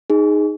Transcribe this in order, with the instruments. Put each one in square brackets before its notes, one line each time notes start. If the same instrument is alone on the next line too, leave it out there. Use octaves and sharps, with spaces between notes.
[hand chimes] D#4 G#4